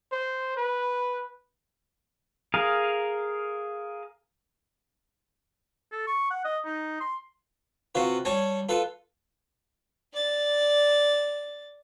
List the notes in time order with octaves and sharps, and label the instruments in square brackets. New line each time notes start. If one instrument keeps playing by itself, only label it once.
[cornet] C5
B4
[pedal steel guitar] G#4 A#4 F5
[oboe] A4
C#6
F#5
D#5
D#4
C6
[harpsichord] C3 F4 F#4 B4
G3 C#5 G#5 A5
F4 A4 B4
[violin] D5 A6